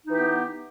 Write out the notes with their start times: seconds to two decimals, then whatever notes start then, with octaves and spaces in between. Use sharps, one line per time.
0.05 D#4
0.09 E3
0.12 G4
0.16 B3